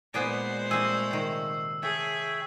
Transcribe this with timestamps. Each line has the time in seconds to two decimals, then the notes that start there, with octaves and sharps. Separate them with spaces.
0.14 A#2 G#3 B3 G#4 B4 C5 D5
0.71 G3 A3 C4 G#4 E6 C7
1.11 C3 D#3
1.83 G#4 A4 C#5 E5 G5